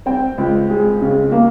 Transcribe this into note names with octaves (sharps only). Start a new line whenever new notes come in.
C4 G5
C#2
G#3
C#3
A#3